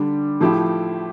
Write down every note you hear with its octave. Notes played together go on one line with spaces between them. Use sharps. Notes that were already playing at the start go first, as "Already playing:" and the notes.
Already playing: D3 G3 D4
A2 F3 A3 E4 G4